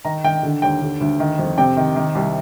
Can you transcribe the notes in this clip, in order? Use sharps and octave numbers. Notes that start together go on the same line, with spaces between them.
D#3 A#5
D#3 G5
D3
D#2 G5
D3
D2
D#3
F2
C3 G5
D#3
D#3
C2